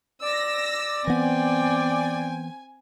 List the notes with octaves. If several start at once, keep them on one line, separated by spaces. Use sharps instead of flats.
D5 E6 A#6
E3 B3 C4 G5 G#5